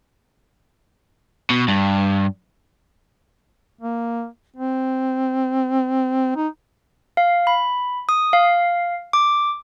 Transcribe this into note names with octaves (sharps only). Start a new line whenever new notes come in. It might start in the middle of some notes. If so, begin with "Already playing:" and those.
B2
G2
A#3
C4
D#4
F5
B5
D#6
F5
D6